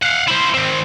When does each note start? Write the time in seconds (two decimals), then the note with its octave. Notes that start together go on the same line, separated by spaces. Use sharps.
0.03 F5 F#5
0.28 E4 C5
0.54 D#3 C4